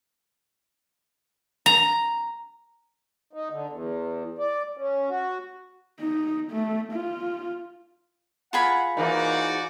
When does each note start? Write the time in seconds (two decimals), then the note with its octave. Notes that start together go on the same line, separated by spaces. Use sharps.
1.66 A#5
3.33 D#4
3.50 D3
3.69 E2
4.38 D5
4.77 C#4
5.09 F#4
6.00 D#4
6.51 A3
6.93 F4
8.53 F4 G#4 F#5 B5
8.97 G#2 E3 A#3 D#4 F#4 D5